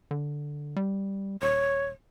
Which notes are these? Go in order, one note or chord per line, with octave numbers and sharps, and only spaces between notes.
D3
G3
D#1 C#5